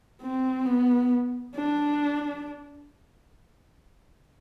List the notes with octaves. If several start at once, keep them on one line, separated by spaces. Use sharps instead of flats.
C4
B3
D4